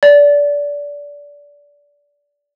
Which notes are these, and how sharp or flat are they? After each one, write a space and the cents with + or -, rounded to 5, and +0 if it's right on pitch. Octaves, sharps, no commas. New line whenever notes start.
D5 -20